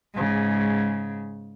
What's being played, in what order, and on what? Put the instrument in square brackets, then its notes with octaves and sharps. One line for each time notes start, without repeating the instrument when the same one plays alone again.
[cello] G#2 C#3